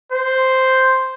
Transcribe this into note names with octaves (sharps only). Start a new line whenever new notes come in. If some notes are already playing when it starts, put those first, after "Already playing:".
C5